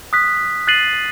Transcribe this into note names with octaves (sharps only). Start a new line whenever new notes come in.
D#6 F#6 B6
F#6 A6 C7 D#7 F#7